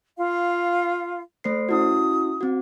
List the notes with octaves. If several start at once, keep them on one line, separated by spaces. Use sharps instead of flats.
F4 F5
A3 C5 C7
C#4 E4 F#4 D#6
C4 F#4